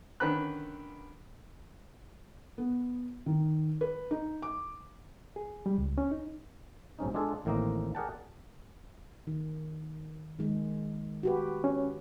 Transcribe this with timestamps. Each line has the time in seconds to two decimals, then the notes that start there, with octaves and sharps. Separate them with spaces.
0.20 D3 D#3 C#4 B4 B5 F#6
2.58 B3
3.26 D#3
3.81 B4
4.11 D#4
4.42 D6
5.36 G#4
5.66 G3
5.78 C#2
5.98 C#4
6.11 D#4
6.99 B1 G#2 C#4 D#4
7.14 G#3 D4 F4 G#4 A4
7.45 A1 A2 D#3 A#3 C4 D#5
7.95 G#4 A#4 D5 F#5 G5 A5
9.27 D#3
10.39 D#3 G#3
11.23 F#4 G4 B4
11.64 C#4